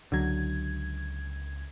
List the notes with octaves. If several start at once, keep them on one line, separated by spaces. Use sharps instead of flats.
C#2 D3 F#3 G#6